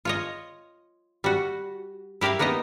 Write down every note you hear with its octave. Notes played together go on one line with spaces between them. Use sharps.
F4 C#5 D#5
G3 F#4
E4 G4 A#4 E5 F5
A#3 B3 D#4 G4 D#5